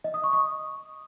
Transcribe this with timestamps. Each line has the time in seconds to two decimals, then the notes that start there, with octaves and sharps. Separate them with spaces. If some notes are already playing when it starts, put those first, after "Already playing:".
0.04 D#5
0.14 D#6
0.24 C#6
0.33 D#6